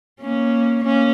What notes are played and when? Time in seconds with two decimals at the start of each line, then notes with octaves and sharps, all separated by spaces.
0.21 A#3 C#4
0.84 A#3 C#4